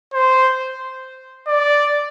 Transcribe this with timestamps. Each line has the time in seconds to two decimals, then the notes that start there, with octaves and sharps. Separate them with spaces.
0.14 C5
1.47 D5